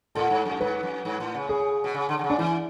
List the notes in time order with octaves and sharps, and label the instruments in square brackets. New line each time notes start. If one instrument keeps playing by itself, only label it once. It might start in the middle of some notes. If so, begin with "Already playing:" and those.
[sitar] A2 [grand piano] A4
[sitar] G#2
[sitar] F#2 [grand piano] A4
[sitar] G#2 [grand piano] B4
[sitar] F#2
G#2
A2
C#3
[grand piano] G#4
[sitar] B2
C#3
D3
D3
C#3
[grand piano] D4
[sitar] E3 [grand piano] E4